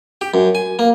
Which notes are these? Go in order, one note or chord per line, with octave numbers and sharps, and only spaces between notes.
G4
F#2
G#5
A#3